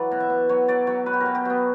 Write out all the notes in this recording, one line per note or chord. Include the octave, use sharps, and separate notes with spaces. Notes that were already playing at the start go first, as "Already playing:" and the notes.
Already playing: E3 F#3 D5
B2
E5
B2
F#3 C#5
F#3 D5
F#3 C#5
B2 B4
G4
A#4
B2
G4
F#3 B3